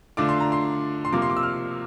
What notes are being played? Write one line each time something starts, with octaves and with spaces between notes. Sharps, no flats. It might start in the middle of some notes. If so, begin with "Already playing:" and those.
D3 A3 D4 F4 D6
C6
A#5
C6
C6
C3 F3 A#3 D6
C6
D6
E6
F6